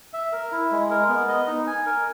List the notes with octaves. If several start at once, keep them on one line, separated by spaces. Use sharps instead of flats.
E5
A#4
E4
G#3
A#4
B3
D#5
D#4
G#5
A#4